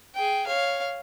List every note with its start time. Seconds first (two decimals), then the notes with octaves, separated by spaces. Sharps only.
0.14 G#4 G5
0.46 C#5 F5